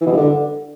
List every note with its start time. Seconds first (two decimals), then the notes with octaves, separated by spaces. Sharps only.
0.01 E3
0.06 B2
0.12 G2
0.17 D3